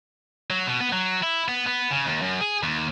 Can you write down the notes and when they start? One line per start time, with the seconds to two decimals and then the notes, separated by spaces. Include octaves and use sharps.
0.50 F#3
0.67 B2
0.80 B3
0.92 F#3
1.23 E4
1.48 B3
1.67 B3
1.91 C#3
2.05 D#2
2.22 F#2
2.41 G#4
2.63 D#2